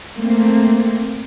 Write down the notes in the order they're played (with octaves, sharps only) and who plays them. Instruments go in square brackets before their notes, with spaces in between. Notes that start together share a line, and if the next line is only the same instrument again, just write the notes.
[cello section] A3 A#3 C4